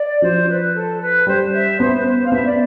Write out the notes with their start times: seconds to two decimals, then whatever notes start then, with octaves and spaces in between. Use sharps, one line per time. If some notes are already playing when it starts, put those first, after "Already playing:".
Already playing: D5
0.22 F3 C5
0.49 B4
0.75 A4
1.01 B4
1.27 G3 C5
1.54 E5
1.80 B3 C5
1.99 B4
2.06 C5
2.25 F5
2.32 B3 E5
2.46 D5